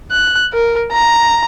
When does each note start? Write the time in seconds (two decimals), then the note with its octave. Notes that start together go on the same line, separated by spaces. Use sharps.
0.11 F#6
0.53 A#4
0.93 A#5